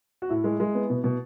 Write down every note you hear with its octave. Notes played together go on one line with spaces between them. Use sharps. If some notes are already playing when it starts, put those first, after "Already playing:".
F#4
A2 E4
G#3
G#3
B3
B2
B2